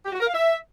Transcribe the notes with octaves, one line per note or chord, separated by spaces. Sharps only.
G4
F#4
A#4
F5
E5